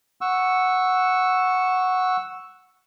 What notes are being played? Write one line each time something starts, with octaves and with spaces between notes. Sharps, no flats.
F#5 C#6 E6